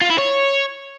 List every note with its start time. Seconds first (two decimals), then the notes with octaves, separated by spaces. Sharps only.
0.01 F4
0.10 E4
0.18 C#5